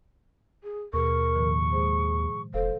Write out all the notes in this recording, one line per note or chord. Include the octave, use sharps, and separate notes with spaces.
G#4
D#2 B2 G#4 A#4 C#6
A2 D#3 F3
G#3 G#4 C5
E1 A4 C5 F5